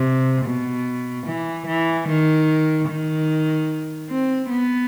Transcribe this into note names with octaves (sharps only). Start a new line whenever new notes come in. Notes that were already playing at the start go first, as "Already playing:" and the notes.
Already playing: C3
B2
E3
E3
D#3
D#3
C4
B3